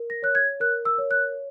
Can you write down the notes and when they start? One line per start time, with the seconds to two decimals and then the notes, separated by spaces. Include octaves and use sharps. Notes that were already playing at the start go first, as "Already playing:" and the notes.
Already playing: A#4
0.10 A#6
0.23 C#5 F#6
0.35 G#6
0.60 A#4 F#6
0.85 E6
0.98 C#5
1.11 F#6